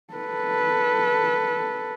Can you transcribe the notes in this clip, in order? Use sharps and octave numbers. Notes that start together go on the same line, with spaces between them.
A4 B4